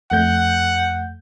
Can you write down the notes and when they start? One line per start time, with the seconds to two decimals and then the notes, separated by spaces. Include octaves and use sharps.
0.11 F2 A3 F#5 G6